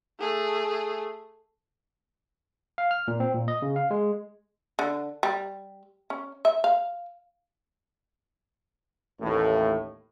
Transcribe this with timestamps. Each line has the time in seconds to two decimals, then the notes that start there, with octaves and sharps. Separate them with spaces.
0.20 A3 G#4
2.78 F5
2.91 F6
3.08 A#2
3.20 C4
3.34 A#2
3.48 D#5
3.62 C#3
3.76 F5
3.91 G#3
4.79 D3
5.23 G3
6.10 C#4
6.45 E5
6.64 F5
9.21 A1 D#2 A2